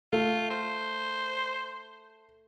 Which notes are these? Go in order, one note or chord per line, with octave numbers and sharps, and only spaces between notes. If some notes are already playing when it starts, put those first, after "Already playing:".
A3 F4
C5